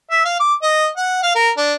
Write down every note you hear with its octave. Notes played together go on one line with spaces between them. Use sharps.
E5
F5
D6
D#5
F#5
F5
A#4
D4